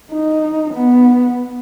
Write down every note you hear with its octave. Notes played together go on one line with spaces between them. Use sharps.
D#4
B3